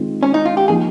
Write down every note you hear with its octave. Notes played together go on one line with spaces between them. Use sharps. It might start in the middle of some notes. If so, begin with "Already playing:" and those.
Already playing: D#3 G#3 C4 F4
C#4
D#4
F4
G4
F3 A#3 D#4 G#4